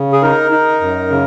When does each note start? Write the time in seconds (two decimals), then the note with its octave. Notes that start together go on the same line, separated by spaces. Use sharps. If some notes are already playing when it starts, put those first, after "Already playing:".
Already playing: C#3
0.12 G#4
0.22 D#4 A#4
0.51 D#4
0.81 F#2
1.10 C#3